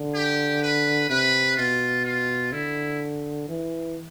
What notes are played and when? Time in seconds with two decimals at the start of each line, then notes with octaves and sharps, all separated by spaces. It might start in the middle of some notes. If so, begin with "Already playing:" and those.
Already playing: D3
0.14 G4
0.62 B4
1.10 C3 B4
1.57 B2 F4
2.04 F4
2.52 D3 E4
3.48 E3